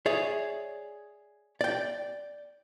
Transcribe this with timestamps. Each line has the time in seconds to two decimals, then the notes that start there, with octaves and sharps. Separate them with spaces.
0.06 G#4 C#5 D5 E5
1.61 D5 G5